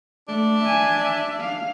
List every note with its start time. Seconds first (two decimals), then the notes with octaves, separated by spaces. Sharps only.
0.28 A3 D4
0.63 E5 G#5
1.01 E5
1.41 F5